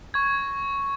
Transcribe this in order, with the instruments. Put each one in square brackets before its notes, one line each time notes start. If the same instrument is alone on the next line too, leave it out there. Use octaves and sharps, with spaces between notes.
[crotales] C#6 G#6